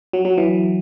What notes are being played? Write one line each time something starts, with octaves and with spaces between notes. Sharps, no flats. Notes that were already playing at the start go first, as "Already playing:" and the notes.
F#3
F#3
E3